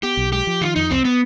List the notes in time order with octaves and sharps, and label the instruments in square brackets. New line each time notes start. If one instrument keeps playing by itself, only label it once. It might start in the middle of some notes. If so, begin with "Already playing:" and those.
[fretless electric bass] B3 [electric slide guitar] G4
[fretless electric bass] B1
[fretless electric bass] G#3 [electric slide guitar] G4
[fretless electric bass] F3
[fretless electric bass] D#3 [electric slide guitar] F4
[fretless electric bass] F2 [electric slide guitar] D#4
[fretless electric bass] C2 [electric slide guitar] C4
[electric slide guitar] B3